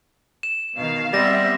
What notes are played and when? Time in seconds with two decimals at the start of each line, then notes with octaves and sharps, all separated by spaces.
0.43 E7
0.76 B2 D#3 F5
1.13 G3 B3 C4 E5 A6 A#6